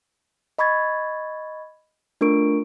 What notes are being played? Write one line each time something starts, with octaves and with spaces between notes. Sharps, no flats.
D#5 B5 C#6 G#6 A6
A3 D4 F4 A#4 C#6 D7